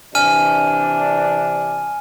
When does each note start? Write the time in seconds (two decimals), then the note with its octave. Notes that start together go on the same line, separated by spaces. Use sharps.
0.15 C3 E3 D4 G#5 F6 D#7